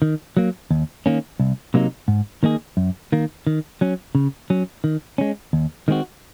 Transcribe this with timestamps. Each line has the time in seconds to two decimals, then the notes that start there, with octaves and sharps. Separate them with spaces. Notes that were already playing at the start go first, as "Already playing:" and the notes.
0.02 D#3
0.37 F#3 A#3
0.71 D#2
1.06 D#3 A#3 C#4
1.40 C2
1.74 C3 F#3 A#3 D#4
2.08 G#2
2.43 D#3 A#3 D#4 G#4
2.77 F#2
3.12 D#3 A#3
3.47 D#3
3.81 F#3 C#4
4.15 C#3
4.50 F#3 C#4
4.84 D#3
5.18 G#3 C#4
5.53 D#2
5.88 D#3 G#3 C4 F#4